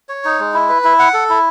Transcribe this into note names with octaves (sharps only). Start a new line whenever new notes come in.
C#5
D#4
G#3
E4
B4
E4
F#5
A4
E4